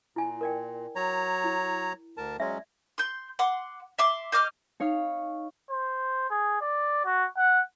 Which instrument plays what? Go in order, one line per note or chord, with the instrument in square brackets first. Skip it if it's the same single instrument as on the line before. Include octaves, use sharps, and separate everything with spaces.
[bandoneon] A#2 [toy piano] E4 G#5
[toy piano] A#4 D5 G5
[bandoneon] F#3 C#5 A#5
[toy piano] E4
[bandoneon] D2 A#4 A5
[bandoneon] F#3 G#3 C#4 [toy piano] D5 E5
[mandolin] C6 G6
F#5 C6 D6
E5 C6 D6
C5 D#5 D6 F6
[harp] D#4 C#5 F5
[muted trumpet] C5
G#4
D5
F#4
F#5